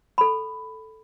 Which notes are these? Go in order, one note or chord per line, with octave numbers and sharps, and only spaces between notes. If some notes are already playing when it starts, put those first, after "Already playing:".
A4 B5